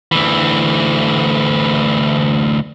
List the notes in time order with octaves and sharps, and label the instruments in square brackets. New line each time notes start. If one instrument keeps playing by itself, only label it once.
[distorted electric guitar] D2 E3